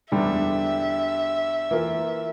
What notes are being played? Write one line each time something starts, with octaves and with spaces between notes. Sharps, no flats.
E2 D3 G3 D4 E5
E3 A#3 F4 A#4